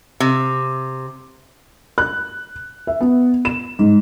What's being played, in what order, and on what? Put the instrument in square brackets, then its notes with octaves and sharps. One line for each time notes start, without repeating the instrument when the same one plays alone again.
[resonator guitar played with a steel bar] C3
[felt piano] F#6
E5
B3
E7
G#2